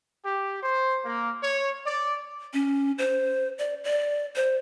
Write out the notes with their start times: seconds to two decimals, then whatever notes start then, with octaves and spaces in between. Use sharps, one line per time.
0.24 G4
0.63 C5
1.05 A#3
1.42 C#5
1.87 D5
2.54 C#4
2.98 C5
3.58 D5
3.84 D5
4.36 C5